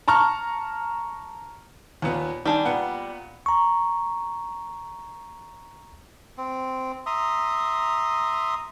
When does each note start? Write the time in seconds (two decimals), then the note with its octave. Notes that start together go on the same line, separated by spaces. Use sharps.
0.08 A5 A#5 C#6 F6
2.02 D#2 A#2 B3
2.46 D#3 G3 D4 G#5
2.65 A#2 B3 F#5
3.46 A#5 C#6
6.38 C4
7.06 E5 A#5 C6 D#6